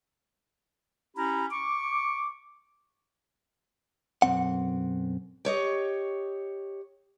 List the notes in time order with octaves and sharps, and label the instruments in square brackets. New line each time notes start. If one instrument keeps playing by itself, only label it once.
[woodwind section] C#4 E4 G4 A#5 B5
C#6 D6
[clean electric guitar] B1 F#2 B2 C4 F#5
[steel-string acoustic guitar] G4 C#5 D#5